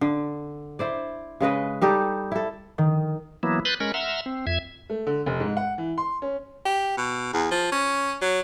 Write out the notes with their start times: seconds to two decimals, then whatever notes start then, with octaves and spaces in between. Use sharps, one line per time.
0.01 D3
0.79 E4 C5 D5
1.40 C#3 G#3 B4 D#5
1.82 G3 D#4 G4 A4
2.32 E4 A4
2.78 D#3
3.43 E3 F#3 A#3 B3 E4
3.65 B4 B5 C6 F#6 G6 A6
3.80 G#3 C#4 A#4 B5 C#6
3.94 E5 F#5 A#5 C6 E6 F6
4.26 C4
4.47 F2 E5 G#6
4.90 A3
5.07 D3
5.26 F1
5.40 G#2
5.57 F#5
5.78 E3
5.98 C6
6.22 C#4
6.65 G4
6.97 B2
7.33 E2
7.51 F3
7.72 C#4
8.22 F#3